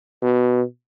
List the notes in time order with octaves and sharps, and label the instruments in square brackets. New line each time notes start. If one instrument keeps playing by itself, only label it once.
[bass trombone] B2